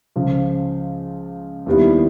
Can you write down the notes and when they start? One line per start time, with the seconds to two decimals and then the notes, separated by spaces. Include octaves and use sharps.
0.16 C#2 C#3 F3
1.66 D#2 D#3 G3 B3 E4